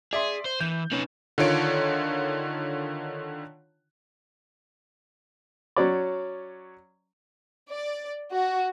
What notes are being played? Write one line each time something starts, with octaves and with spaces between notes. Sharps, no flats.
G#4 D5 E5 C6
C5
E3 G6
C#4 D#4 B4
D3 D#3 F4 C#5 D7
F#3 C#4 D5
D5
F#4